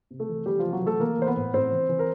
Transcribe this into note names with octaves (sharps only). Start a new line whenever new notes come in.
C3
A3 A4
E3
E3 G3 G4
C3 F3 F4
F#3 F#4
E3 A3 A4
E3 A#3 A#4
E3 C5
B3 B4
A2
A2 C4 C5
E3
E3
A#4